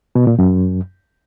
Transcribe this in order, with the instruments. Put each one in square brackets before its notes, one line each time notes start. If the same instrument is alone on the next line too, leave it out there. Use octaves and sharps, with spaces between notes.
[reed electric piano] B2
A#2
F#2